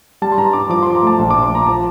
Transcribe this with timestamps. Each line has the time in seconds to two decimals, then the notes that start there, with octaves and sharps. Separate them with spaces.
0.22 G3 A5
0.32 C6
0.38 G2 A#5
0.53 G2 D6
0.69 F3 D6
0.83 F3 C6
0.95 A#5
1.03 A3 A5
1.19 A#1 A5
1.30 A#1 D6
1.42 C6
1.51 A#1 A#5
1.67 F3 A5